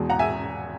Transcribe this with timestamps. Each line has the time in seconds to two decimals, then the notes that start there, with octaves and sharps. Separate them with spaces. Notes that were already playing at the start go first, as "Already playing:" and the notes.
Already playing: E2 B2 G#3
0.10 F#5 A#5
0.19 E5 G#5